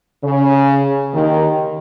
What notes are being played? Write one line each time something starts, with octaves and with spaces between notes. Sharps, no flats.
C#3
D#2 D#3